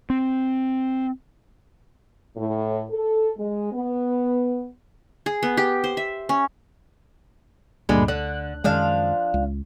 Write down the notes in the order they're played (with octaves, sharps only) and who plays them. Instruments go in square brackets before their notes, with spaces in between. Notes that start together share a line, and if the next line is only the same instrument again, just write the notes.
[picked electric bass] C4
[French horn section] A2
A4
G#3
B3
[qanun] G#4
B3
G4
C5
E5
C#4
[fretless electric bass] D2 [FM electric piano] G2 A#2 G3 [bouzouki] D3 G#3 E4
[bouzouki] D3 [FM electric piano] F#6
[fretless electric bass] F#2 D#3 G#3 [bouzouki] F3 D4 F5
[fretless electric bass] C#2